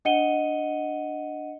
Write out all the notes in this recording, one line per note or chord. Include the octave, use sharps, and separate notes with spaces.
D4 D#5 F#5 C#7 D#7 G7